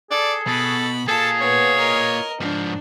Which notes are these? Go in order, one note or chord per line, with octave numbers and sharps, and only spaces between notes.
G#4 A4 D5
B2 A4 B5
A#3 F4 G#4 A4 A5
B3 C#5
A#4 D#5
G#2 F3 D4